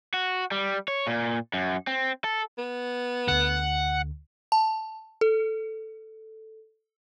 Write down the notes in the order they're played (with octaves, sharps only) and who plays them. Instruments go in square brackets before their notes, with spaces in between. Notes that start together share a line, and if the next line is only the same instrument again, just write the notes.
[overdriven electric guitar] F#4
G3
C#5
A#2
F#2
C4
A4
[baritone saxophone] B3
[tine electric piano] D2 D3 [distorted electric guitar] F#5
[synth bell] A5
A4